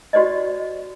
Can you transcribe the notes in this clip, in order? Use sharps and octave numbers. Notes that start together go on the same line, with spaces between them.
F#4 G4 C5 D5 D#5